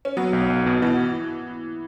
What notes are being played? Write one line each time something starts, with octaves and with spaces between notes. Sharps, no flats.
C#4
F#3 B3
B1
B1
B2
B2 E3